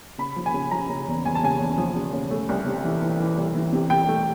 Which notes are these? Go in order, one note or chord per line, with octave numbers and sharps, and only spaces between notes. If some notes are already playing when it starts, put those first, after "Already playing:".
C#3 B5
F3
G#5
C#3
F3 A#5
C#3
E2
E2 G#5
A5
C#3 G#5
E2
F3
C#3
C#3
A3
C2
C3
E3
E3
E3
C2
E3
C3
C3 G5
A3